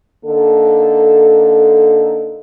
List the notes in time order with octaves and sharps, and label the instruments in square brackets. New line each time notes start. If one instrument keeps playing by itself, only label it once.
[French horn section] D3 A#3 D#4 A4